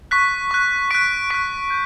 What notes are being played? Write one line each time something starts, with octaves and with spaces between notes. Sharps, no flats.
C#6 F#6 B6
C#6 F#6
C#6 F#6 B6 D7
C#6 F#6 B6 D7
G6